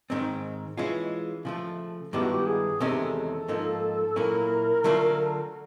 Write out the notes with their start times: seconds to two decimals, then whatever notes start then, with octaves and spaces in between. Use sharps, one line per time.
0.10 G#2 D#3 G#3 C4
0.77 E3 G#3 C#4 F4
1.45 C#3 F3 A3
2.13 G2 D#3 G#3 B3 E4 G4
2.23 F#4
2.32 G4
2.47 G#4
2.80 E2 C3 D#3 G#3 C#4 A4
3.48 G#2 F3 A#3 D#4
4.16 A#2 F#3 A#3 C#4 E4 A#4
4.84 D3 F#3 A3 D4 F4